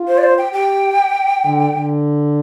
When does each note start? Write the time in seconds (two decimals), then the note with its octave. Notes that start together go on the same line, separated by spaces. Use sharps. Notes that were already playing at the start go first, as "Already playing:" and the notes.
Already playing: F4
0.08 C5
0.18 D5
0.23 C5
0.38 G5
0.53 G4 G5
1.44 D3
1.74 D3